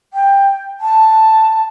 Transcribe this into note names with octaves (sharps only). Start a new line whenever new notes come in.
G5
A5